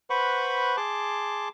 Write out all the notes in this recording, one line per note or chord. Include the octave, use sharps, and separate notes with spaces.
B4 C5 F#5 B5 C#6
G#4 A5 C6 D6